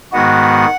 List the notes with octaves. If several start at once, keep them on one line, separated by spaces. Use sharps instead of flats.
G#2 D#3 G#3 B3 F#4 F#5